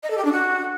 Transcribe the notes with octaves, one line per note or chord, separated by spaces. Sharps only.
D#5
A4
G4
D4
F#4